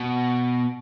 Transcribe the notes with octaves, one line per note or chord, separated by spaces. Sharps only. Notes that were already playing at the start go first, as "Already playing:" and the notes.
Already playing: B2